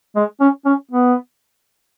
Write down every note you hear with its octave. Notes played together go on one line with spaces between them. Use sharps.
G#3
C#4
C#4
B3